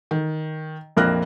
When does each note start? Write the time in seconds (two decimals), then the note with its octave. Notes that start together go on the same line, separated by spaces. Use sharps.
0.11 D#3
0.97 A#1 F2 A#3 F6 F#6 A#6